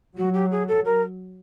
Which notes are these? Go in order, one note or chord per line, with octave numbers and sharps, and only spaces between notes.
F#3 F#4
G4
G#4
A4
A#4